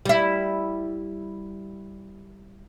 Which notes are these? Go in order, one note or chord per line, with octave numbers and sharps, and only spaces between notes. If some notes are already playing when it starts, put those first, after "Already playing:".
G3 E4